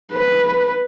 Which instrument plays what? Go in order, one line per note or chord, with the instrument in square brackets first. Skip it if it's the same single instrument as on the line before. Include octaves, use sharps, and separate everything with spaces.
[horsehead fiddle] B4